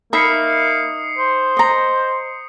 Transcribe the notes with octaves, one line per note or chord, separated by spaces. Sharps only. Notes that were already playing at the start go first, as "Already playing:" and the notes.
A#3 D#4 E5 B5 D#6 C7 C#7
C5
D#5 A#5